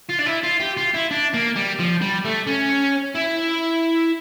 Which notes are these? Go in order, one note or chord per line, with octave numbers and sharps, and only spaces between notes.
F4
D4
E4
F4
G4
F4
E4
D4
A#3
G3
F3
G3
A3
C#4
E4